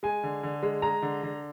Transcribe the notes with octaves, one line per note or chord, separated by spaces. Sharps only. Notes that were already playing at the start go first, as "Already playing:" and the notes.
G#3 G#5
D3
D3
G#3
G#3 A#5
D3
D3